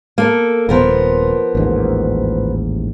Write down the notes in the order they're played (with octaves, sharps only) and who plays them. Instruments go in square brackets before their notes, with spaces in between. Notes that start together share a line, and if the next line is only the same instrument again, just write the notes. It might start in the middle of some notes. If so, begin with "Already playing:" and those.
[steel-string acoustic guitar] A#3 A4
[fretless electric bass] D#1 [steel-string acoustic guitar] F3 B3 A#4
[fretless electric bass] A1 D#2 G#2